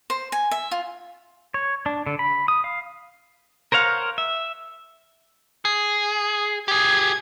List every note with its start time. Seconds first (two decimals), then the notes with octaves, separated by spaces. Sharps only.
0.10 C5
0.32 G#5
0.51 E5
0.71 F4
1.54 C#5
1.86 D4
2.06 D3
2.19 B5
2.48 D#6
2.64 F5
3.72 A#4 C5 C#5 F5 F#5
4.18 E5
5.65 G#4
6.68 G4 G#4 G#6